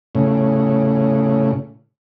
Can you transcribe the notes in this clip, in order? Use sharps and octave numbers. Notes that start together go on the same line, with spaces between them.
A2 C#3